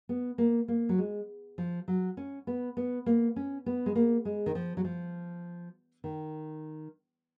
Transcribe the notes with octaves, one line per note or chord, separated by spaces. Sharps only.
B3
A#3
A#3
F#3
G#3
F3
F#3
C#4
B3
B3
A#3
C#4
B3
G#3
A#3
G#3
D#3
F3
F#3
F3
D#3